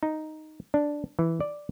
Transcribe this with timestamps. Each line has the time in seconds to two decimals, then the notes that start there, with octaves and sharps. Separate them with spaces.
0.03 D#4
0.74 D4
1.19 E3
1.40 D5